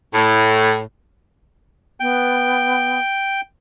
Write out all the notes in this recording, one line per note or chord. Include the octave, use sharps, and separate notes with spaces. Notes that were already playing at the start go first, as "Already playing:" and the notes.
A2
B3 G5